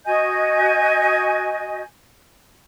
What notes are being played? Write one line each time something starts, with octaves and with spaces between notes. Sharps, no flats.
F#4 D#5 G#5 G6